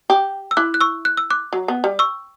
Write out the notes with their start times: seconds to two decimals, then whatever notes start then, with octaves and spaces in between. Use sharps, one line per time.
0.10 G4
0.51 E6
0.57 E4 D6 F#6
0.74 F#6
0.81 C#6 E6
1.05 F#6
1.17 E6
1.31 D6 F#6
1.53 F#3
1.68 B3
1.84 G3
1.99 C#6 E6